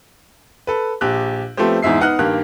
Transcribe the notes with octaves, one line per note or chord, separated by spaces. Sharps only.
A4 B4
A#1 G4 F#6
F3 A3 B3 C4 G4 C5
E2 G#2 G#3 E5 C7
B3 D#4 F#5 F6 F#6
G2 D#3 A#3 G4 F#6